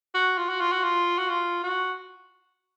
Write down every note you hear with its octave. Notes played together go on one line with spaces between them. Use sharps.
F#4
F4
F#4
F4
F#4
F4
F#4
F4
F#4